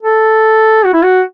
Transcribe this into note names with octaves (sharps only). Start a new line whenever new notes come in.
A4
F#4
E4
F#4